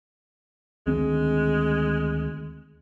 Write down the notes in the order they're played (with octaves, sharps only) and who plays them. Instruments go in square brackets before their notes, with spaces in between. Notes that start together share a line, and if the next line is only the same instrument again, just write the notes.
[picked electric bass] D2 D#3 C4 [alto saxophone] G#3